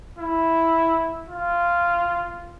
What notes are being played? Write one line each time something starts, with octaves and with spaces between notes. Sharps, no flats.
E4
F4